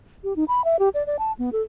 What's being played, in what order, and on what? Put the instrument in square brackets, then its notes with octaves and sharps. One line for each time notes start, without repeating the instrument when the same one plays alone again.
[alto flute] G4
D#4
B5
E5
G4
D5
D5
A5
B3
A4